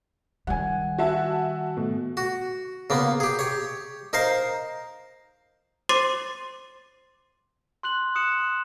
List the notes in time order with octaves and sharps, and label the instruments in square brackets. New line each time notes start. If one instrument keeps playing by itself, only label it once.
[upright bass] D#3 G3 [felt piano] F#5 G#5
[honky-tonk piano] F#4 E5 A5
[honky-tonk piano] B2 [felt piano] A3
[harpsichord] F#4
C#3 A#3 B3
G4 G#4
G4 C#5
D#4 A#4 C5 F5
[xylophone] C5 C6 D6 A6 C7 D#7
[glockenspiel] C6 F#6 F#7
D#6 F#6 C#7 E7